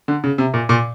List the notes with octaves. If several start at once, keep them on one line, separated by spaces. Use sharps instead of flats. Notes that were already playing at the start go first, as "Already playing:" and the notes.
D3
C#3
C3
A#2
A#2